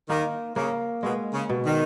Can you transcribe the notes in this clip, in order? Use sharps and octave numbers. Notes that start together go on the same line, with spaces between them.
D#3 A#3
C#3 A#3
B2 G#3
C#3
B2
D#3